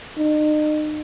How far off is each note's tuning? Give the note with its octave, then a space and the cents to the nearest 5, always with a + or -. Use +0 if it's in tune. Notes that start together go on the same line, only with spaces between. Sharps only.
D#4 -40